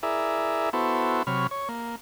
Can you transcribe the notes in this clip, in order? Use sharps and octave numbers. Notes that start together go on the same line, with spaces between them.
E4 G#4 A#4 D5 E5
B3 E4 F#4 A4 C5
C3 F#3 C#5 B5 F6
C#5
A#3